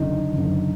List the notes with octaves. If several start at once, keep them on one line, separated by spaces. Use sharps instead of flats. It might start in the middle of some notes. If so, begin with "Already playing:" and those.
Already playing: F#1 F#2 D3 D#4
F#1 F#2 D3